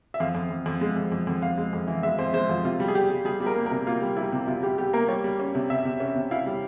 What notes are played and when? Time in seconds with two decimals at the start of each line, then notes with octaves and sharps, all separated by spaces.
0.14 E5
0.20 F2 F5
0.35 F2
0.50 F2
0.66 F2
0.81 G#3
0.96 F2
1.12 F2
1.27 F2
1.42 F2 F5
1.58 G#3
1.73 F2
1.87 E3
2.03 G#3 E5
2.19 F2 C5
2.33 G#3 C5
2.49 F2 F4
2.64 C3 F4
2.80 G3
2.88 G#4
2.95 G3 G4
3.10 G3
3.25 G3 G#4
3.40 G3
3.46 A#4
3.56 A#3
3.66 A#4
3.71 C3
3.87 A#3 F4
4.02 G3
4.17 G3 E4
4.32 C3
4.48 C3 F4
4.63 G3 G4
4.78 G3 G4
4.93 A#3 A#4
5.08 G3 C#5
5.24 G3
5.40 C#4
5.55 C3
5.70 C3 E5
5.85 C3
6.00 C#4
6.16 C3
6.31 E4 F5
6.46 G3